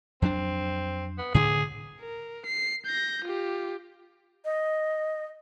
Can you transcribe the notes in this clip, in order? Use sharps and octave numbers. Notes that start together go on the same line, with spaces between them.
F2 F#3 C4 D4
B3
A2 D3 G#4
A#4
C7
G6 A#6
F4 G4
D#5